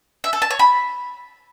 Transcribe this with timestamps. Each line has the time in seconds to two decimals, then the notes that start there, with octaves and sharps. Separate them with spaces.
0.24 E5
0.33 A4
0.42 A5
0.51 C#5
0.59 B5